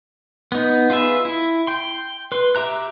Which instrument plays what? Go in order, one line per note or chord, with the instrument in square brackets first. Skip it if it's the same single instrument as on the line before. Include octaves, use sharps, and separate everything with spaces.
[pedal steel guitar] B3 D#4
F4 G#4 B4 E5
E4
G5 C6
B4 C6
G4 E5 A#5 F#6